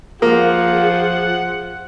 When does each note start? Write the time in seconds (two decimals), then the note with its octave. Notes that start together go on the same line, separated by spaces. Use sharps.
0.22 F3 A#3 F4 G#4 F#5